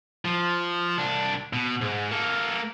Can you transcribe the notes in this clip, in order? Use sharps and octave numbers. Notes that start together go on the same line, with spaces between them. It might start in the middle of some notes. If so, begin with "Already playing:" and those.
F3
C2 D4
B2
G#2
A#3 A4